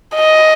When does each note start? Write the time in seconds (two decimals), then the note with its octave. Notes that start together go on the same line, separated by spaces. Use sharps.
0.15 D#5